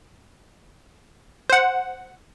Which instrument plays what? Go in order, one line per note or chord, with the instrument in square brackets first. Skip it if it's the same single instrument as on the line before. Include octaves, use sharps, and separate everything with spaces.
[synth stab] C5 F#5